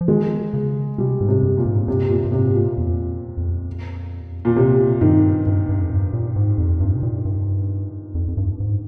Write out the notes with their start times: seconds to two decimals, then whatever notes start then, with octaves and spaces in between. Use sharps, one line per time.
0.01 F3
0.08 D#3 G#3
0.53 C#3
0.98 C3 G3
1.21 G#2
1.29 C3
1.43 G2
1.58 A#2
1.65 G#2
1.88 G2 C3
2.10 A#2
2.24 G2
2.32 G#2 C3
2.55 A#2
2.78 F2
3.37 F2
4.45 A#2
4.56 C3
5.01 G2 D#3
5.46 G2
5.69 G2
5.81 F2
5.91 G2
6.13 A#2
6.36 G#2
6.58 F2
6.80 G2
6.95 C3
7.03 A#2
7.25 G2
8.15 F2
8.28 F2
8.37 G2
8.60 G#2